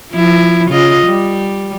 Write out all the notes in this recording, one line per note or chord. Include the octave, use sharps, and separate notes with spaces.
F3 E4
C#3 F4 D#5
G3